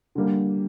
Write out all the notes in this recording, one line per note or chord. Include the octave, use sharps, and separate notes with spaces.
D3 G3 A#3